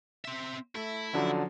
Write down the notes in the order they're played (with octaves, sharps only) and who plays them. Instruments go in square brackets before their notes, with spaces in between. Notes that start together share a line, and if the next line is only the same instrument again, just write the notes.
[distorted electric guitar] C4 E5
[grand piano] A3 [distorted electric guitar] E4
[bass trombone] D3 [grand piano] F3 F#3 C#4